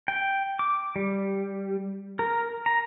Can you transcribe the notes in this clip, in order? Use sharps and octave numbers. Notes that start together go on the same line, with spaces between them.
G5
D6
G3
A#4
A#5